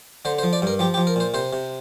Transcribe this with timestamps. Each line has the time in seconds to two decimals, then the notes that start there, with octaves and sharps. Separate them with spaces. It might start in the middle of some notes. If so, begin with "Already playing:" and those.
0.25 D3 C5
0.39 C5
0.43 F3
0.53 D5
0.62 G2 A#4
0.79 F3 G4
0.94 G4
0.98 F3
1.07 A#4
1.16 A#2 C5
1.34 C3 C5
1.53 C3